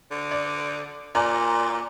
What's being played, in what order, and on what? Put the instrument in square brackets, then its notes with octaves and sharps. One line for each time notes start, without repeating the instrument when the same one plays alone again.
[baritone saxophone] D3
[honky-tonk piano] D5
[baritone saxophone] A#2 [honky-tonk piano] D5 G#5 A#5